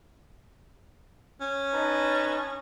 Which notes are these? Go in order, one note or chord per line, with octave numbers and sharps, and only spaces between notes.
C#4
D#4 B4 A5